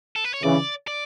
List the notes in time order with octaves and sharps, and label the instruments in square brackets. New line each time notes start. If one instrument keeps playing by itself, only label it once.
[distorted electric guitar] A4
B4
C#5
[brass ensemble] C#3 E3 [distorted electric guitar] D5
[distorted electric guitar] D5